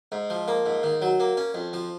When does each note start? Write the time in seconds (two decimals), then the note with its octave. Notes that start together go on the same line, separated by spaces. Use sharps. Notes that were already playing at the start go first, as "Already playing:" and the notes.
0.12 G#2
0.30 F3
0.48 A#3
0.66 G#2
0.83 D#3
1.01 F#3
1.20 A#3
1.37 C#4
1.54 F2
1.73 F3